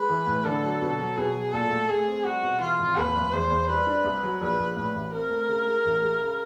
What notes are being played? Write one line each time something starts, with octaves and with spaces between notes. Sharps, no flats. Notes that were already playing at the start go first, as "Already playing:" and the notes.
Already playing: G#3 B4
E3
A2
D3 A4
F#3
B2
F#3
B2 G#4
F#3
A#2 A4
A3
A3 G#4
C4
G3 F#4
B2
E3 F4
G#1
D#2 B4
F1
E2 C5
E2
G3 B4
D4
C2
F#3
A#1 B4
A#1
A2 B4
A1
C4 A#4
A3
C#3
G#3
A1
G#3
C#3